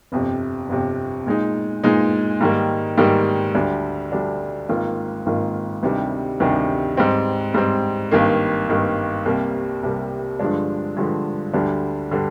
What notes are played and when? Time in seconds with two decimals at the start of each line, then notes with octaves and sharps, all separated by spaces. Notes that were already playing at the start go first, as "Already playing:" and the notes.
0.12 G1 F2 C3
0.69 G1 F2 C3
1.26 A#2 G#3 D#4
1.84 A#2 G#3 D#4
2.41 G#2 D#3 G3 A#3
2.98 G#2 D#3 G3 A#3
3.55 D2 D3 G3 D4
4.12 D2 D3 G3 D4
4.69 G#1 G#2 D#3 A#3 F4
5.26 G#1 G#2 D#3 A#3 F4
5.83 D2 C3 D#3 G3 D4
6.40 D2 C3 D#3 G3 D4
6.97 G#2 G3 C4
7.54 G#2 G3 C4
8.11 G#1 G2 D#3 A#3
8.68 G#1 G2 D#3 A#3
9.25 C2 C3 G3 A#3
9.83 C2 C3 G3 A#3
10.40 G2 D3 F3 G#3 D4
10.97 G2 D3 F3 G#3 D4
11.53 D2 D3 G3 D4
12.11 D3 G3 D4